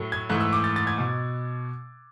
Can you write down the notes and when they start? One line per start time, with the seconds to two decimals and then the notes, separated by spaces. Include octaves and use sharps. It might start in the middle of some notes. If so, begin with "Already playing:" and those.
Already playing: A2 F#3 A3
0.12 G#6
0.29 G#2 E3 A3 F#6
0.40 E6
0.53 D6
0.64 A6
0.76 A6
0.87 G#6
0.98 B2